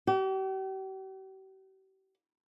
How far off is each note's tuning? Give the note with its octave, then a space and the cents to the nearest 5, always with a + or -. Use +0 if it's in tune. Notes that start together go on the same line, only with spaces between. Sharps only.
G4 -45